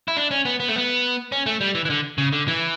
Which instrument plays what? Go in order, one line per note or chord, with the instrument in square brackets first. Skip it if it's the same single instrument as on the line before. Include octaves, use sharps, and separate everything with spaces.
[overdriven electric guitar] E4
D4
C#4
B3
B3
A3
B3
C#4
A3
G3
E3
E3
D3
C#3
D3
E3